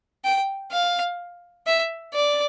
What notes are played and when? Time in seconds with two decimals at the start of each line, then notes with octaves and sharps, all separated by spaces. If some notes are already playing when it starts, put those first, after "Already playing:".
0.25 G5
0.72 F5
1.67 E5
2.14 D5